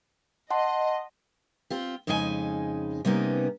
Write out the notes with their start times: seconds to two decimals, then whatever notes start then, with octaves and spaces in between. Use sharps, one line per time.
0.51 D#5 F#5 A5 C6
1.70 C4 F4 G4
2.07 F2 C#3 G#3 D#4 G4 G#5
3.05 C3 G3 A#3 B3 C#4 D#4